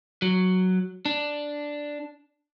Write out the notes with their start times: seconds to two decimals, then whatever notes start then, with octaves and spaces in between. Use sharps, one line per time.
0.22 F#3
1.05 D4